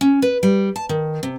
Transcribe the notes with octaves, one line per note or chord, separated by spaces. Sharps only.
C#4
B4
G3
A5
D#3
C3